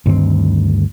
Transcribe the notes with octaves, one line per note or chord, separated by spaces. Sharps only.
D2 G2 D#3 C4